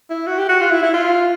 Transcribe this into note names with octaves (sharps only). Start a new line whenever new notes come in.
E4
F#4
G4
F#4
F4
E4
E4
F4